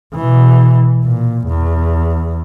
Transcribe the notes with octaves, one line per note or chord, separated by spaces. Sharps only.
B2 E3
A#2
E2